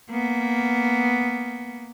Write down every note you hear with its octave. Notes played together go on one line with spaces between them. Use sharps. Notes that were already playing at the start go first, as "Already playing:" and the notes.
A#3 B3